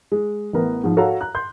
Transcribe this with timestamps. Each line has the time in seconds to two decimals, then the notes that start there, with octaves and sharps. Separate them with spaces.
0.12 G#3
0.53 A1 E3 B3 A#4 B4
0.84 G#2 F3
0.97 F#4 A4 C#5 F5 F#5 A#5
1.21 A#5 F#6
1.35 C6 G6